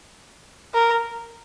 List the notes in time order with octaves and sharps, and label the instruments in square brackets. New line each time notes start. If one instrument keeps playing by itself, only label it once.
[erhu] A#4